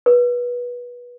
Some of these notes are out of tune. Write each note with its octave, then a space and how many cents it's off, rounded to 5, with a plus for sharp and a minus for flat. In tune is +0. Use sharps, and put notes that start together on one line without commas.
B4 -20